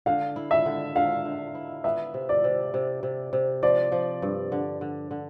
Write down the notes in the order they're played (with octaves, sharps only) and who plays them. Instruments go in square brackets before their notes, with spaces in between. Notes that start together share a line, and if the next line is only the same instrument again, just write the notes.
[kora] D3 [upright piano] F5
[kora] E4
[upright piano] E5
[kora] D3
[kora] D3 [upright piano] F5
[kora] D3
E4
[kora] B3 [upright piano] E5
[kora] C3
[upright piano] D5
[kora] C3
C3
C3
C3
[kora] F3 [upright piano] D5
[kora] F3
G2
D3
D3
D3